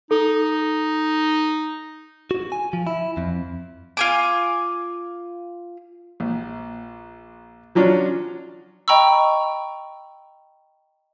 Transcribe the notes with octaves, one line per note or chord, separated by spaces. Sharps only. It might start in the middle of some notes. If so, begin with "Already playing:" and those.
D#4 A4
F#4
G#5
F3
E4
F2
F4 G#5 D6
A#1
F3 F#3 C#4 D4 F4
D#5 G5 A#5 B5 C#6 E6